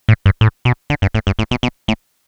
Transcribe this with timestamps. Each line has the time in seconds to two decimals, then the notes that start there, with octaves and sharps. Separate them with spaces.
0.09 A2
0.26 G2
0.41 A2
0.65 B2
0.90 D3
1.02 G2
1.14 A2
1.27 G2
1.39 A2
1.51 B2
1.63 B2
1.88 A2